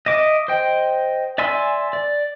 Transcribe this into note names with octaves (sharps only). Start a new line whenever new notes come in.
D#5 E5 D6
C5 D#5 G5
D5 E5 G#5 C6 E6
D5